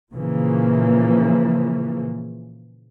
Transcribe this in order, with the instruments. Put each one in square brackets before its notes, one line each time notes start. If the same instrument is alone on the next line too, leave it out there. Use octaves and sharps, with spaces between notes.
[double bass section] A#2 C#3 E3 F3 A#3